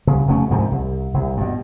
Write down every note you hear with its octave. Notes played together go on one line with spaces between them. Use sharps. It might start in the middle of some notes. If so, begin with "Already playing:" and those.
C2 C#3
F1 C#3 A3 C#4
C2 G#2 C3 F3
C2
C2
G2 B2